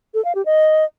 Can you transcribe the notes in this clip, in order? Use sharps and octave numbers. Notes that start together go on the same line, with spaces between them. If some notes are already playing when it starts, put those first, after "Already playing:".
A4
F5
G4
D#5